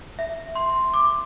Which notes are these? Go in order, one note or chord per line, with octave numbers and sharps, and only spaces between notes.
E5
C6
D6